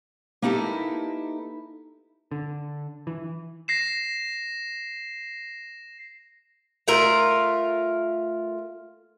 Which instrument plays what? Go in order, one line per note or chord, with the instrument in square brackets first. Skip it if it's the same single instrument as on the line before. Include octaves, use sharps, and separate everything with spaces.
[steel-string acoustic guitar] A#3 D#4 E4 G4 A4 B4
[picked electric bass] D3
E3
[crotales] A#6 C7 E7
[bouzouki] A3 F4 A#4